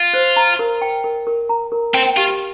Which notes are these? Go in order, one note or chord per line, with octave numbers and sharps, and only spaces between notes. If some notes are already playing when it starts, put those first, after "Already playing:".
Already playing: F4
C5
A#5
A#4
G5
A#4
A#4
A#5
A#4
C4 G5
F4 G4